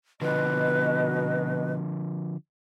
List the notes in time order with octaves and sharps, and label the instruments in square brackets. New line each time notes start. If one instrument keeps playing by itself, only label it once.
[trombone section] B2 [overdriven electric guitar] D3 F3 [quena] B4 [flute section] D#5